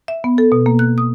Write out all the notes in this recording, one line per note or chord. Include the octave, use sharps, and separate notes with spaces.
E5
B3
A4
B2
A#3
F#6
D#6